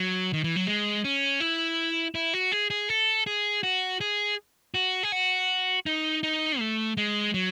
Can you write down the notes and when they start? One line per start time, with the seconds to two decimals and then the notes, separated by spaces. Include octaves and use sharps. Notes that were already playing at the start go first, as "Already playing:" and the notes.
Already playing: F#3
0.33 D#3
0.44 E3
0.56 F#3
0.67 G#3
1.04 C#4
1.40 E4
2.15 E4
2.34 F#4
2.52 G#4
2.70 G#4
2.89 A4
3.27 G#4
3.63 F#4
4.01 G#4
4.74 F#4
5.03 G#4
5.12 F#4
5.86 D#4
6.23 D#4
6.59 A3
6.97 G#3
7.34 F#3